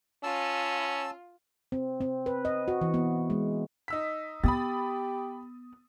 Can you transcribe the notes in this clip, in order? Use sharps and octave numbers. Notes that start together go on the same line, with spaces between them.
C#4 F4 A5 E6
C4
C4
B4
D#5
F#4
E3
B3
G#3
D#4 E6 B6
B3 G4 B5 D#6 A6